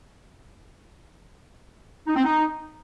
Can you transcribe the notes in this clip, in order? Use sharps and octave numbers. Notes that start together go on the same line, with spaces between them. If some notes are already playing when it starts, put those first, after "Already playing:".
D#4
C4
D#4